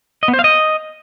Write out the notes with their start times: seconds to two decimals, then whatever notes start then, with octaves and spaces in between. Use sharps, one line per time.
0.23 D#5
0.28 B3
0.33 C5
0.39 F5
0.44 D#5